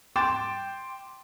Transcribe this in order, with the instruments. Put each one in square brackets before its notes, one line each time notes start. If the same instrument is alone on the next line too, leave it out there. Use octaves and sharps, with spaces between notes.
[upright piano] G5 C6 D6 A6 E7